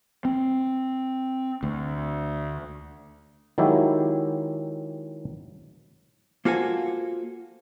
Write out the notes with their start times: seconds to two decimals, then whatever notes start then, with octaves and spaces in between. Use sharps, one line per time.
0.25 C4
1.63 D2
3.58 D#3 F#3 G#3 E4 G4
6.45 A#3 F4 F#4 A4 C5 G#5